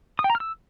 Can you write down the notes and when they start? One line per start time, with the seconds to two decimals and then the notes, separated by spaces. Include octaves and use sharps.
0.19 D#6
0.24 G5
0.30 A#5
0.35 F6
0.40 E6